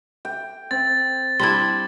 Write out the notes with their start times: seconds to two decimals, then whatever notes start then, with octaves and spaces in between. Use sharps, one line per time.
0.25 G5
0.71 C4 A6
1.40 G3 D4 E4 C6 G#6